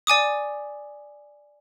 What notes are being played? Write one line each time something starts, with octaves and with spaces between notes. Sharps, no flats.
D5 G#5 D6 D#6